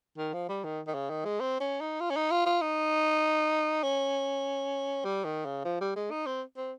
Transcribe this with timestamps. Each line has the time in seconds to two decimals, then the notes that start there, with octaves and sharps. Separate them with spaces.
0.18 D#3
0.33 F3
0.49 G3
0.64 D#3
0.87 D#3
0.94 C#3
1.10 D#3
1.25 G#3
1.40 C4
1.60 C#4
1.80 D#4
2.01 F4
2.10 C#4
2.16 D#4
2.31 F4
2.46 F4
2.61 D#4
3.83 C#4
5.04 G3
5.25 D#3
5.45 C#3
5.65 F3
5.81 G3
5.96 G#3
6.11 D#4
6.26 C4
6.57 C4